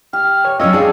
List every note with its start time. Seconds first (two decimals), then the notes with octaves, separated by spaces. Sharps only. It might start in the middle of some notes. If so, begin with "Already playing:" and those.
0.13 G4 F6
0.45 C#5
0.60 F#3 C#4 D4 F4 D#5 E6
0.73 D4 D#4 F#4 G#4 C5 F5 A5